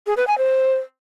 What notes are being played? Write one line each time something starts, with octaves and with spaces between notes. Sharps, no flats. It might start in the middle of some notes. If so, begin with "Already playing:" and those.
G#4
B4
G#5
C5